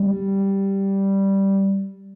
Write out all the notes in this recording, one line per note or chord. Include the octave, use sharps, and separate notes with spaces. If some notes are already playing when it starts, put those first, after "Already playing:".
Already playing: G3